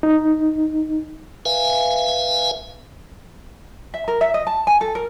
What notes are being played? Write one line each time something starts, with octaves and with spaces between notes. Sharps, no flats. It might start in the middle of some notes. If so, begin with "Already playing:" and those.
D#4
B4 E5 F5 G#5
E5
A#4
E5
D#5
A5
G#5
A4
A#4